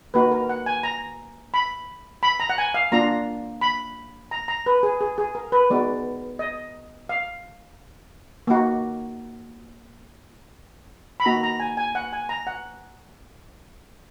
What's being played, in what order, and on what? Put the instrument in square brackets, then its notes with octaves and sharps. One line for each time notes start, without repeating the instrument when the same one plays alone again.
[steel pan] A#3 D#4 F#4 B4
A#4
F#5
G#5
A#5
B5
B5
A#5
F#5
G#5
F5
A#3 D4 F4 A#5
B5
A#5
A#5
B4
G#4
G#4
G#4
A#4
B4
G#3 B3 D#4 F#4 D5
D#5
F5
A#3 D#4 F#4
B5
A#3 D#4 F#4 A#5
A#5
G#5
G#5
F#5
G#5
A#5
F#5